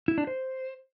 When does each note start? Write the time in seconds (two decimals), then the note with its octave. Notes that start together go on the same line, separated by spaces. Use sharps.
0.08 E4
0.18 D4
0.27 C5